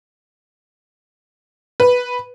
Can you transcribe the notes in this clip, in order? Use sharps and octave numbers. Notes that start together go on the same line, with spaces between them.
B4